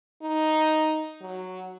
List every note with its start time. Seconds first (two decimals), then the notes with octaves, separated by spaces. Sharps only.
0.22 D#4
1.21 F#3